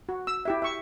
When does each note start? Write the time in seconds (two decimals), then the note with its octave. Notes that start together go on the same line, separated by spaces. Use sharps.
0.09 F#4
0.27 E6
0.45 E4 G4 E5
0.62 E5 C#6